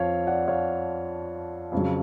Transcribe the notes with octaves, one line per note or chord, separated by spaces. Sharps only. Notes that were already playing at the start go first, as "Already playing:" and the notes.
Already playing: F2 F3 C#5 F5
D5 F#5
C#5 F5
F2 C#3 F#3